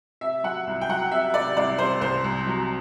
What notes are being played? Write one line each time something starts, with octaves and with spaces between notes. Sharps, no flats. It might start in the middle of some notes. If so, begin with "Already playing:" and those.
C3 E5
F#3 F#5
C2
G5
F#3 F#5
C3 E5
C3 D5
C2 D5
C3 C5
C2 C5
C2
F#3